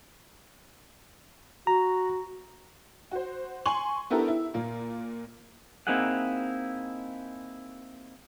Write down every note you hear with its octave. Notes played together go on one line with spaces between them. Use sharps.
F#4 A#5
F#4 C5
G#5 C6 C#6 F#7
B3 D4 E4 G4 A4 A#4
E4
A#2 A#3
A#3 C4 D#4 E4 G#4 F#5